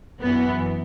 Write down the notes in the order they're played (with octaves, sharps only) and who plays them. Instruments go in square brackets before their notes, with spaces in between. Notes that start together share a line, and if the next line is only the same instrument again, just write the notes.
[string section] F#2 E3 B3